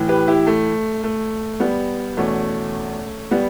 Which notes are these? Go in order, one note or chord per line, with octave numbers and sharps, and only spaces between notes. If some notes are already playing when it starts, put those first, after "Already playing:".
Already playing: A2 E3
G4 B4
E4 G4
A3
A3
G3 B3
E2 B2 A3 C#4
G3 B3